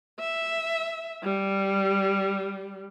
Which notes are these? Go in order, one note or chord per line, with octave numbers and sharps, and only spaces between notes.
E5
G3